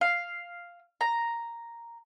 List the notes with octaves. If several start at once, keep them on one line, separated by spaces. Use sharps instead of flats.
F5
A#5